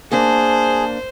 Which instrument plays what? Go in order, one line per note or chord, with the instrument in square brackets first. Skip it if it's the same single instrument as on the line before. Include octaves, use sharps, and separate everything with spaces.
[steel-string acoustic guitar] A#3 D4 [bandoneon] G#4 [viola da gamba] C5 [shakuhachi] A5